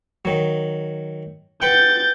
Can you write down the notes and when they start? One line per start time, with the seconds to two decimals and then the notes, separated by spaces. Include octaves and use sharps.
0.25 D#3 F#3
1.62 B4 F#5 G5 G6 A6